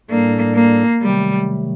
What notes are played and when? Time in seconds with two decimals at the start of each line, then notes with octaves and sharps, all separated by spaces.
0.10 A2 G3 A#3 D4 A4 D5
0.56 A#3
1.02 C3 D#3 F#3 G3 A3